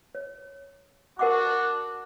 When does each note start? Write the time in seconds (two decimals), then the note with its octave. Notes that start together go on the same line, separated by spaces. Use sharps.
0.15 C#5
1.19 D4 F#4 A#4 F#5 D6